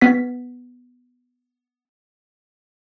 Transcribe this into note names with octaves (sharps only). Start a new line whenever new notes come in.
B3 B6